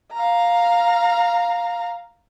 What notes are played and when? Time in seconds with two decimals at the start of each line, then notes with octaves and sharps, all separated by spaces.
0.13 F5 A#5